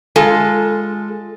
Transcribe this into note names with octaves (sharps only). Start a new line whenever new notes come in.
G#3 F4 A4